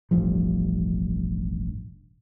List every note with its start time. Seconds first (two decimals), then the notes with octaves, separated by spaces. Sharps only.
0.11 E1 A1 G2 F3